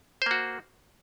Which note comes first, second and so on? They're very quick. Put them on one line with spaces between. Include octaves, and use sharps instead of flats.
C5 A#3 F#4